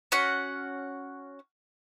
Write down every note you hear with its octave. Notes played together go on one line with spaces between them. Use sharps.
C#4 F#4 F#5